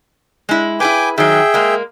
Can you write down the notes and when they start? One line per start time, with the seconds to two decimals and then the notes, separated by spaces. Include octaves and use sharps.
0.49 G#3 E4
0.80 E4 G#4 B4 G5 G#5 D6
1.18 D#3 F#3 G#4 E5 G5
1.54 G#3 A#3